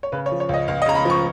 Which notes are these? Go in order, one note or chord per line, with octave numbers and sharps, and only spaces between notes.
C#5
C#3 B4
C#5
F3
C#5
C#2 D#5
C#2 F5
D#5
C#3 A#5
B5
F3 C#6